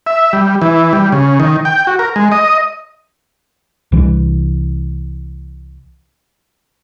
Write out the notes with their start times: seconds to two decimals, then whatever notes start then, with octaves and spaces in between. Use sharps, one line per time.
0.07 E5
0.33 G3
0.62 E3
0.93 G3
1.12 C#3
1.40 D#3
1.65 G5
1.87 F#4
1.99 A#4
2.16 G#3
2.32 D#5
3.92 C2 E3